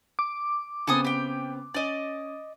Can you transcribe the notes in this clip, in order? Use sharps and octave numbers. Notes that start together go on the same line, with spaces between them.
D6
C#3 B3 C4 A4 G#5 D#6
G4 G5
C#4 D5 D#5